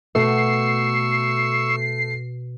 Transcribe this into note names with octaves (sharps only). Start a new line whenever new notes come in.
B2 A3 C#6 E6 C7